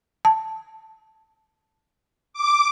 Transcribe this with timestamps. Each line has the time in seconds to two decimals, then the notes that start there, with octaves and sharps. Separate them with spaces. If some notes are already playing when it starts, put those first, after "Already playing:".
0.25 A5
2.33 D6